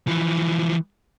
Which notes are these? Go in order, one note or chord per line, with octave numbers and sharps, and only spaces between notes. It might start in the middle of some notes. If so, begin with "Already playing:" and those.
E3 F3